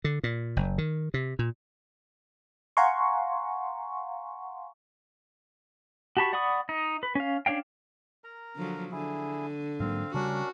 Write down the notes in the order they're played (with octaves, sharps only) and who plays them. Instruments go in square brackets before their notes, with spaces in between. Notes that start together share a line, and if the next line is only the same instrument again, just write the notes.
[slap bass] D3
A#2
F#1
D#3
C3
A#2
[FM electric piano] F5 F#5 G#5 A#5 C6 C#6
[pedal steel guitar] F#4 G4 A5 B5 C#6
D5 F#5 B5 C#6 D#6
D#4
B4
C#4 F5
C#4 D4 C#5 F5 G5
[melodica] A#4 A#5
[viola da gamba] D3 F3 F#3
[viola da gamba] D3 [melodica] E4 G#4
[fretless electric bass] G#2 F#3 A#3 [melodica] C4 F5
[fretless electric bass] C#3 G3 [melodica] C#4 D4 A#4 [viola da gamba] F#4